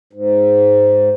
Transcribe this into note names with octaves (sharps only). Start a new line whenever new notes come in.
G#2